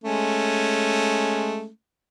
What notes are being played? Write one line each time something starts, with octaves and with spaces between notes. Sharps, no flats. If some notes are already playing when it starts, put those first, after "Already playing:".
G#3 A3 C#4